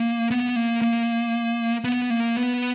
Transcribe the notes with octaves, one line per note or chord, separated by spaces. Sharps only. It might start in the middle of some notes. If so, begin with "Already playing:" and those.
Already playing: A#3
B3
A#3
A#3
B3
A#3
B3